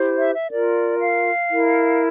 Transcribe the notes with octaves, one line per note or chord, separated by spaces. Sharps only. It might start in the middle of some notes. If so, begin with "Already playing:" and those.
Already playing: E4 G4 C5
E5
E5
F4 A#4 D5
F5
E4 A#4